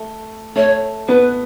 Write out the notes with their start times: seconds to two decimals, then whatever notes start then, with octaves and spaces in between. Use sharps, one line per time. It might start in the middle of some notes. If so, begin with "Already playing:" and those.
Already playing: A3
0.56 A3 C#5
1.07 B3 B4